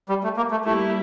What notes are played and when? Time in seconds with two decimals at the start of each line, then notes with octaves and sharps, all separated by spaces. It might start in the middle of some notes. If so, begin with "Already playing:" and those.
0.09 G3
0.24 A3
0.37 A#3
0.51 A3
0.64 G3 A3 A#3 E4 G4